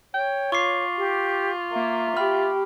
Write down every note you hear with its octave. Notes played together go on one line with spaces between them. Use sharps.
C#5 G5
F4 C#6 D6 C7
G4
A#3 E5
G4 B5 F6